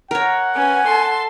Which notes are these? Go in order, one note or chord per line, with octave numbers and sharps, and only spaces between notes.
A#4 C#5 F#5
C#4 B4 G#5
A4 A5 C6